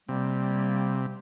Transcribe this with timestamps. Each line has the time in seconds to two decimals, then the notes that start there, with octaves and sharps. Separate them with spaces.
0.08 C3 G3 A#3